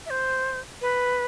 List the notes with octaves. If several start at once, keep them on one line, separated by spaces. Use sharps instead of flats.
E5
C5
B4